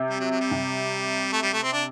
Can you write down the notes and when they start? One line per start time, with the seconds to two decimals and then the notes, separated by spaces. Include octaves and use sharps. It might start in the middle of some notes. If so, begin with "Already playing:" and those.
Already playing: C3
0.10 G3
0.20 F#3
0.31 F#3
0.41 G3
0.51 C3
1.33 A3
1.43 G3
1.53 A3
1.63 C4
1.73 D4